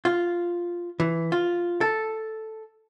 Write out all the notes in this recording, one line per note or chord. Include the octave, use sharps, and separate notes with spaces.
F4
E3
F4
A4